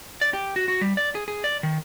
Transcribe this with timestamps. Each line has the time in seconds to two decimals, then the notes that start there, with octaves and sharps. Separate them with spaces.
0.21 D5
0.33 G4
0.56 F#4
0.68 F#4
0.81 G3
0.97 D5
1.15 G#4
1.28 G#4
1.44 D5
1.63 D#3